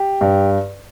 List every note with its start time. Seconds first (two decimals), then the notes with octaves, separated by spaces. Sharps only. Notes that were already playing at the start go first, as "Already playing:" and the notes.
Already playing: G4
0.21 G2